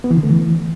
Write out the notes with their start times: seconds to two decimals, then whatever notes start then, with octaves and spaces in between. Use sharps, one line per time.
0.04 B3
0.11 E3
0.17 D3
0.23 A3
0.30 E3